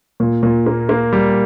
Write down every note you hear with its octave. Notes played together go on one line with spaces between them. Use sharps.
A#2
A#2
A#3
A#3
G3